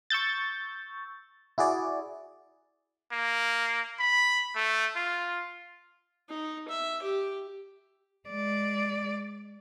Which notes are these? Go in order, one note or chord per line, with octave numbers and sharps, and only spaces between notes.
C#6 E6 G6 A6
E4 F#4 G#4 D5
A#3
B5
A3
F4
D#4
E5
G4
G#3 D5